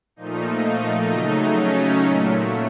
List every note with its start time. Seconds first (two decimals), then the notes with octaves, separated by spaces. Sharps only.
0.16 A#2 F3 A3 D#4
0.62 D#4
1.08 C#3 F#3 A3 D#4
1.55 C#4
2.01 A#2 F#3 A3